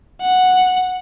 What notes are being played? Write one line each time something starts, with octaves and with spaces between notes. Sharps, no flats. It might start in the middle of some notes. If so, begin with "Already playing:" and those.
F#5